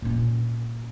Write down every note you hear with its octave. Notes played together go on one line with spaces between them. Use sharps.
A#2 C#4